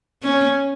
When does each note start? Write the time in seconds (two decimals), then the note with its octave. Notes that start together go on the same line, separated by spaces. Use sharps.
0.23 C#4